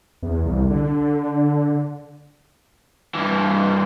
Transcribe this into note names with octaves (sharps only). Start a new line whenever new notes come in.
E2
C2
D3
G2 E3